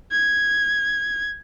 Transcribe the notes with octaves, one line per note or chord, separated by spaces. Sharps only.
G#6